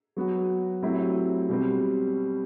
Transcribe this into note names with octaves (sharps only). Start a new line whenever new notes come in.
F#3 B3 F#4
A2 F#3 C4 E4 G4
B2 G3 C4